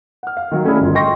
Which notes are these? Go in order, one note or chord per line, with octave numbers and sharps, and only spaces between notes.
F#5 F6
F5
D#3 F#3
A3 C#4 D4 E4 G#4 A4
G1 F4
D#5 G5 C6 C#6 A#6